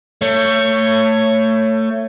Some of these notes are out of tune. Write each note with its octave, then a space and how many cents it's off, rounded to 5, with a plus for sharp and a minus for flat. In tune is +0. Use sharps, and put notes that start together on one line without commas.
A3 +25 C#5 +0